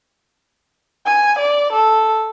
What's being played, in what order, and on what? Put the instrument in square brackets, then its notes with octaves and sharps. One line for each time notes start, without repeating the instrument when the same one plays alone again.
[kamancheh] G#5
D5
A4